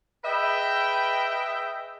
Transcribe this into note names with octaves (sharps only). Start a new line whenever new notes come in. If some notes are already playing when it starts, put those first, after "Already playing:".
G#4 B4 D#5 E5 G5